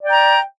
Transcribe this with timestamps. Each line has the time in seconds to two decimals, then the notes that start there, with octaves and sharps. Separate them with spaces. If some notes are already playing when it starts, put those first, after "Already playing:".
0.01 D5
0.06 G5
0.10 A#5